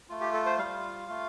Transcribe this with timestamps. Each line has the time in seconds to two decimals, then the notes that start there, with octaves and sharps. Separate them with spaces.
0.09 A3 F4
0.21 G4
0.34 A4
0.46 C5
0.58 G3 F4 F5
1.08 A3 F4